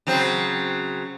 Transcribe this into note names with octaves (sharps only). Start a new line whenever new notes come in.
C#3 F#3 C4